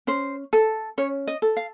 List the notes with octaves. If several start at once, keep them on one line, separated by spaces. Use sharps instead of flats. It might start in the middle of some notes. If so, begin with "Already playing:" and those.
C#4 C5
A4
C#4 C#5
D#5
A4
F5